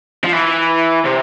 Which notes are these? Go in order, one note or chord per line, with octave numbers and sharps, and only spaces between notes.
F3
E3
C3